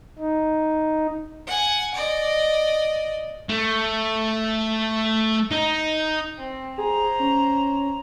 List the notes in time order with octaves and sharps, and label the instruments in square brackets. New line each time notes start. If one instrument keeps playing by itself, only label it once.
[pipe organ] D#4
[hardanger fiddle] F#5 G#5
D5 D#5
[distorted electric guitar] A3
D#4
[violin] C4
[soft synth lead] G#4 [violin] C5 A#5
[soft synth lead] C#4